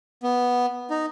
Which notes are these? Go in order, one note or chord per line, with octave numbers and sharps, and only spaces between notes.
B3
D#4